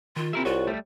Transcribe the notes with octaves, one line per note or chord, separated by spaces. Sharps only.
D#3 F4
C4 E4 G4 G#4 A#4 E5
C2 F4 F#4 C#5
G3 A3